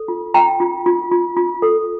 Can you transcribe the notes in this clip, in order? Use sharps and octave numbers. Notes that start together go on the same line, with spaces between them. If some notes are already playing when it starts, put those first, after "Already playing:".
Already playing: A4
F4
F4 G5 A#5
F4
F4
F4
F4
A4